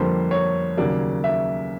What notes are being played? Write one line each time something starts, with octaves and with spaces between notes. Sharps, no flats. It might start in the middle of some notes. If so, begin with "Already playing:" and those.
Already playing: F2 D3 G3 A#3 C5
C#5
D#2 C#3 F#3 A#3 D5
E5